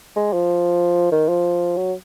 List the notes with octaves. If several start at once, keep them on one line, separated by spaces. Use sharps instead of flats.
G#3
F3
D#3
F3
F#3